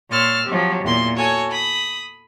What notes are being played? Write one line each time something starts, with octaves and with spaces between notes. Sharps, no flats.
A#2 C#5 C6 E6 F6 A6
F3 F#3 C4 G4
E2 A#2 C6
F#4 A4 C#5 G#5
B5 D#6